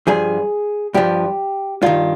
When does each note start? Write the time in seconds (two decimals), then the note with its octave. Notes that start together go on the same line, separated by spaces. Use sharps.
0.07 G2 F3 G#4
0.94 G2 F3 G4
1.82 G2 D#3 F4